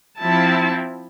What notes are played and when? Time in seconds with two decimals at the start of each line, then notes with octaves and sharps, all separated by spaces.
0.20 F3 C4 E4 A5